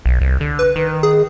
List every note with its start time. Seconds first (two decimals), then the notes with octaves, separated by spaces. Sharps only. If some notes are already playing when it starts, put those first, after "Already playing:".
0.06 B1
0.21 C2
0.41 D3
0.59 B4
0.76 D#3
1.03 G#4